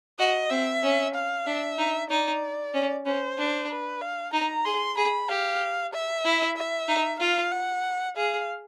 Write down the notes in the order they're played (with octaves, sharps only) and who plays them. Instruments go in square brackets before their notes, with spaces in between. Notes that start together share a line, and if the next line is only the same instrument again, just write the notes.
[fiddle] F#4 [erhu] D#5
[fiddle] C4 [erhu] E5
[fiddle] C#4
[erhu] F5
[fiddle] D4 [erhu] E5
[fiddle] D#4
[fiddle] D#4 [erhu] D5
[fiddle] C#4
[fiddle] C#4 [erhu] C5
[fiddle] D4
[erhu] B4
F5
[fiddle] D#4 [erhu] A#5
[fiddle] G#4 [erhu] C6
[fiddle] G#4 [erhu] B5
[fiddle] G4 [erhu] F5
[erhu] E5
[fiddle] E4
[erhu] E5
[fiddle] D#4
[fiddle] F4 [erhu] F5
[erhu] F#5
[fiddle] G#4 [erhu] F5